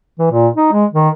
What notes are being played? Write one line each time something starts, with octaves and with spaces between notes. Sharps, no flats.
E3
A#2
D#4
G#3
D#3